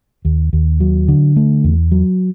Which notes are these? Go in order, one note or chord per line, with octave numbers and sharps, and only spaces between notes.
D#2
D#2
F#3
D3
A3
E2
F#3